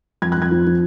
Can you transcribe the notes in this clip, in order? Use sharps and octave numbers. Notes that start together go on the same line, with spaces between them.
F2 G#6
F#6
F2 G#6
F3
F3